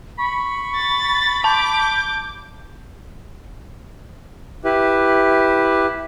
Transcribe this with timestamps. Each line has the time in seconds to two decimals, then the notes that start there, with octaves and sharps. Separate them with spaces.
0.19 B5 C#6
0.75 A6
1.44 A5 D6 G6
4.65 E4 G4 B4